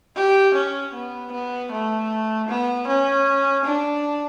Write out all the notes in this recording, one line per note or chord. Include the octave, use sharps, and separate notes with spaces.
G4
C#4
B3
B3
A3
B3
C#4
D4